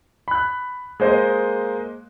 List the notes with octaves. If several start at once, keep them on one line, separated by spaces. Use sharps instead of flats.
B5 F#6
G#3 A#3 C5 D#5